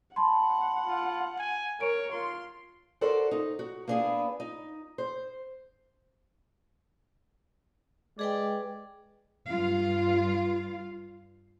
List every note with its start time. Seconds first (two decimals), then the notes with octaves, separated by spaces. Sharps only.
0.16 F#5 A5 B5 C6
0.86 F4
1.39 G#5
1.81 A#4 C#5 D7
2.13 F4 C6
3.01 F#4 A4 A#4 C5 D5 F#5
3.31 D#4
3.59 F#4
3.88 A#3 B3 D4 E4 G#4
4.40 D#4
4.98 C5
8.19 G#3 G#4 B4 D5 G5
9.48 G2 F4 F5